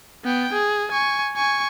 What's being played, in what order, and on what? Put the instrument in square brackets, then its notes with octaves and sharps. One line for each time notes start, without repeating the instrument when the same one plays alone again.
[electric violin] B3 G5
G#4
G#5 C#6
G#5 C#6